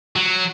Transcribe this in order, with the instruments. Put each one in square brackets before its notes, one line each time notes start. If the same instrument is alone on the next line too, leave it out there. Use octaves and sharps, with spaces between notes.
[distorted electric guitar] F#3